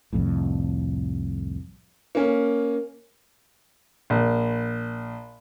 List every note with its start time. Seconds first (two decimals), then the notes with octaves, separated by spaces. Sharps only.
0.13 C2 F2 A2
2.15 A#3 C#4
4.10 A#1